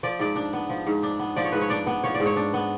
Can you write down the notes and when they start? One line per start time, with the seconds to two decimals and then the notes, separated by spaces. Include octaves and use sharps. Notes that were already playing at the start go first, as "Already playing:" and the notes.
0.03 F3 D5
0.19 G#2 D5
0.36 D4
0.53 B3
0.69 F3
0.87 G#2
1.03 D4
1.19 B3
1.36 F3 D5
1.45 C#5
1.52 G#2 B4
1.61 C#5
1.69 D4 D5
1.86 B3
2.04 F3 C#5
2.14 D5
2.20 G#2
2.26 C#5
2.36 D4
2.54 B3